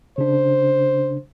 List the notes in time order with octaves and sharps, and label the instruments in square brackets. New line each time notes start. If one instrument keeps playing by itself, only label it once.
[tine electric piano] C#3 D4 [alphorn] C5